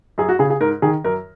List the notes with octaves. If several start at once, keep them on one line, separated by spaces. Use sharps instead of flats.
F#2 G#4
F#4
C#3 G#4
G#4
G#2 A#4
D#3 G#4
F#2 A#4